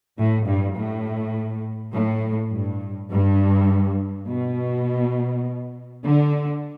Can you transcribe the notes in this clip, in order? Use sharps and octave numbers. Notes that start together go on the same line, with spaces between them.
A2
G2
A2
A2
G2
G2
B2
D3